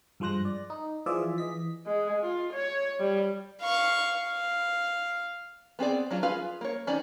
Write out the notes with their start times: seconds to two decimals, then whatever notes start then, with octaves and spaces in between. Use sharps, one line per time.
0.20 G2 F3 G#3 C5 F#6 A#6
0.45 D5
0.70 D#4
1.06 E3 F3 F4 G#4 D5 E5
1.38 E3 D#5 B6
1.86 G#3
2.22 F4
2.53 C#5
3.00 G3
3.62 F5 C#6
4.18 F5
5.79 B3 C4 G#4 D5
6.11 F#3 D4 F4
6.23 F4 G#4 B4 F5
6.61 A#3 C#5
6.87 D#3 C#4 D5